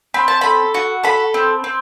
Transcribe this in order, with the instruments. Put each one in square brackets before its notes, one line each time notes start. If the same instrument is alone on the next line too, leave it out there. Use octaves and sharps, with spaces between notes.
[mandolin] C4 B5
A5
A4 B5
F#4
A4 B5
C4
C4